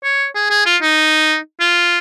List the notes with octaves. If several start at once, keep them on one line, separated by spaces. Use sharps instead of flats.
C#5
G#4
G#4
F4
D#4
F4